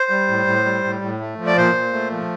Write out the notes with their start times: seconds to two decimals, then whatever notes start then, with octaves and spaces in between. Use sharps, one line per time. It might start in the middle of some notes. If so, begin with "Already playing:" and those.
Already playing: C5
0.10 G3
0.28 A2
0.47 A2
0.65 G3
0.84 A2
1.02 A2
1.20 A3
1.38 F3
1.46 D5
1.57 A#2 C5
1.74 A#2
1.93 A3
2.11 F3